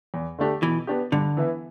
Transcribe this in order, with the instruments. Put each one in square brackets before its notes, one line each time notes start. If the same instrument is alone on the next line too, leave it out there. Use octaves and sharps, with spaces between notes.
[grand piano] E2
D3 A3 D4 G4
[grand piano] B2 [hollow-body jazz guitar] E3
[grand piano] B3 D4 G4
[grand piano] G2 [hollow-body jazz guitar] D3
[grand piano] E3 B3 E4